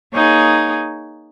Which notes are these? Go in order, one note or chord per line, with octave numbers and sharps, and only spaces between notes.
A#3 D#4 G#4 C#5